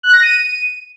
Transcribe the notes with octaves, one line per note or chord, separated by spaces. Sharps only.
F#6
A#6
D#7